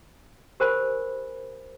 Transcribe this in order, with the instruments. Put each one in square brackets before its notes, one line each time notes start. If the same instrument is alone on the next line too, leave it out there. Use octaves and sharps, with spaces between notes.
[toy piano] G4 A#4 C5 G#5 B5